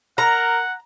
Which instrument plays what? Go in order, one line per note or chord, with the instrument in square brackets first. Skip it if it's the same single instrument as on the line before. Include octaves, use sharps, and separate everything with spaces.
[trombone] A#4 [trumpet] F#5 [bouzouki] A#5